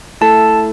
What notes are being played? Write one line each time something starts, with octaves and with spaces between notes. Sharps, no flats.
A3 E4 A4 A5